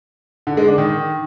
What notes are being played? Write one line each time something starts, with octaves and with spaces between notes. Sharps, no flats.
D3
G#3
D4
D#3